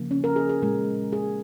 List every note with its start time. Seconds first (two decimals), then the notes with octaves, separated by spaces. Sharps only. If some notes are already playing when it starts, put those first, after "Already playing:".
Already playing: C#3 F3 A#3
0.11 C#4
0.24 A#4
0.36 G#4
0.49 G#4
0.62 A#2 G#3 A#4
1.13 G#4